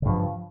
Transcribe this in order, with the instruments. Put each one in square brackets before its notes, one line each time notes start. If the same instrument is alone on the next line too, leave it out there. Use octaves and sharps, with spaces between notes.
[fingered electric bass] C#3
G2
F3